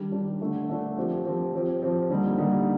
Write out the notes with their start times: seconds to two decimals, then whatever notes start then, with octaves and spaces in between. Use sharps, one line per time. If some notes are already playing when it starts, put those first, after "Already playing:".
Already playing: D#3 G3 D4 G4
0.12 D#3 G3 D4 G4
0.40 D3 A3 D4
0.68 D3 A3 D4
0.97 F3 C4 G4
1.24 F3 C4 G4
1.53 F3 C4 G4
1.82 F3 C4 G4
2.10 D3 G3 A#3 D#4
2.37 D3 G3 A#3 D#4